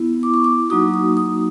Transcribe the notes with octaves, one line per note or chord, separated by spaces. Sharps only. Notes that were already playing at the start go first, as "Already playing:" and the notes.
Already playing: B3 E4
D6
C#6
D6
F#3 A#3 D#4 F#4 D#6
D#6
D#6